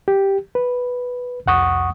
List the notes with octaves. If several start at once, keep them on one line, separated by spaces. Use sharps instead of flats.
G4
B4
C2 F2 F#5 C#6 D#6